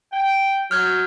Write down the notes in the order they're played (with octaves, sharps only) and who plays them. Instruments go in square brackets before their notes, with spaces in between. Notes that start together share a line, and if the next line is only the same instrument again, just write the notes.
[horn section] G5
[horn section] F#3 [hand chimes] F6 G6 G#6